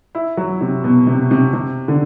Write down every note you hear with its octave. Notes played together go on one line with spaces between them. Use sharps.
E4
F#3
C3
B2
C3
C3
C3
D3